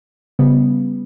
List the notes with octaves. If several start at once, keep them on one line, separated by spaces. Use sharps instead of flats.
C#3 G3 B3